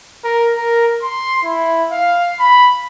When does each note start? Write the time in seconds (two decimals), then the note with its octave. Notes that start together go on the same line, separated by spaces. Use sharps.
0.24 A#4
0.56 A#4
1.02 C6
1.44 E4
1.91 F5
2.39 B5